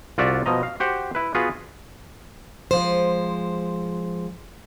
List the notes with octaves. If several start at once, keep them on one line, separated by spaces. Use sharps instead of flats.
C2 F4 F#4 D5 E5
B2 F3 D#5 A#5
F5
F#4 G4 C5 F#5
E4 B4
B3 F4 F#4 G#4 B4
F3 G#3 C5